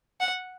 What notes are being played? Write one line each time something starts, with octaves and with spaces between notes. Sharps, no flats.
F#5